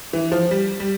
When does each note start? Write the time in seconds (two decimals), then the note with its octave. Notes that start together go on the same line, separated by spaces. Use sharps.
0.13 E3
0.32 F3
0.51 G3
0.80 G3